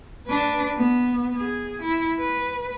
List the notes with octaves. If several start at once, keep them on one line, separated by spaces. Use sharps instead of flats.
D4 B4
B3
G#4
E4
B4